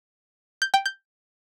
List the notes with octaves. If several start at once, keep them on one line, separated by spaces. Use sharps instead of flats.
G6
G5
G6